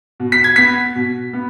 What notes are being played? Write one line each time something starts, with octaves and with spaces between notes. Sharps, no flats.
B2
B6
G#6
B3 B6
B2
B3